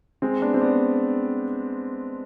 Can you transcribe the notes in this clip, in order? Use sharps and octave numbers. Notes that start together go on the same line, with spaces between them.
G#3 C4
B3 D4
C4
B3 D4